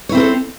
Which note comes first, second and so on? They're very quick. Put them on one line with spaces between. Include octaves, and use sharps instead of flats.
C#5 E4 C4 A#4 A4